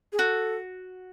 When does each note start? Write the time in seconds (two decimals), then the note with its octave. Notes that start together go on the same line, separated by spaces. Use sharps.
0.13 G#4
0.19 F#4 A4